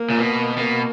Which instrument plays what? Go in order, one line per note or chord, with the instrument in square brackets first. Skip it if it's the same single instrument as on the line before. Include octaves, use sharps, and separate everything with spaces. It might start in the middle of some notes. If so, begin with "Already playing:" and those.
Already playing: [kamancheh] A#3
[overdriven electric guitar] A#2
B2
[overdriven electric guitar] B2 [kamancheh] A#3